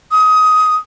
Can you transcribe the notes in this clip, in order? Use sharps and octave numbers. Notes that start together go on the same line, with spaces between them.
D#6